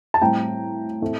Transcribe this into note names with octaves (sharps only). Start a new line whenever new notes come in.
A5
A2 G3 C4 G5 A#5
A2 A3 C4